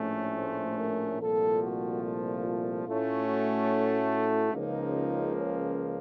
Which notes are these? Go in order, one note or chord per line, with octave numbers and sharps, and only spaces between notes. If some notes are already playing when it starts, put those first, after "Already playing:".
Already playing: A#1 A2 A3 C#4
C5
A#4
C2 A#2 F3 A3 A4
F#4
F4
F4
A2 A3 C#4
F#4
C#2 C#3 F3 A#3 D#4
C#4